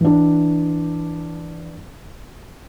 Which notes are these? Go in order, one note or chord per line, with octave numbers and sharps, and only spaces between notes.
E3 D4